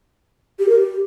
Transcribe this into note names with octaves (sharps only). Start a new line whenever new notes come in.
G4
A#4
G4